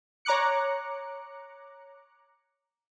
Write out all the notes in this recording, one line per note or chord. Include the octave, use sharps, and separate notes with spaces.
C#5 A#5 D6 F#6 C#7